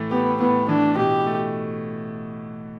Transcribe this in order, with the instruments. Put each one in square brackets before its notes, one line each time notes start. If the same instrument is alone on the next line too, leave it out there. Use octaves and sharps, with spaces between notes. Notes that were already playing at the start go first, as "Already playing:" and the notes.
Already playing: [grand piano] A2 E3 A3
[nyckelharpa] B3 [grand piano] G4
[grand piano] A2 [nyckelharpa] B3
[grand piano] E3 [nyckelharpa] D4
[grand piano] B2 [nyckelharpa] G4
[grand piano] A3